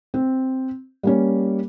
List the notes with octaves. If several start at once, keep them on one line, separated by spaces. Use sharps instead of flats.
C4
G3 A#3 C#4